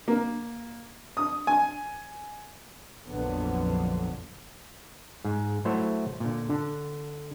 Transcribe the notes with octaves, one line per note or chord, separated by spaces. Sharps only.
A#3
D#6
G#5
A#1 F2 A#2 D3 F#3 B3
G#2
F#3 A3 E4 C5 C#5
A#2 D3
D3